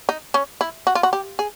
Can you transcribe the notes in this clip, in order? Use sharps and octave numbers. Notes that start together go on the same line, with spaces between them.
D#4
C#4
E4
F#4
F4
F#4
G4
G#4